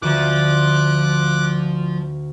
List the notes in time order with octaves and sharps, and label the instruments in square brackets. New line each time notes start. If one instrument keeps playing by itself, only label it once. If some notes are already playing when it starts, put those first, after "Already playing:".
[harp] D2 [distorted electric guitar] F3 [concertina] D6 F#6